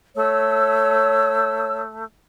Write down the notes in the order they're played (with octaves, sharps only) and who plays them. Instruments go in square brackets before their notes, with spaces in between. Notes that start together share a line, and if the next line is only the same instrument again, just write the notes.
[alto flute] A3 [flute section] C#5 E6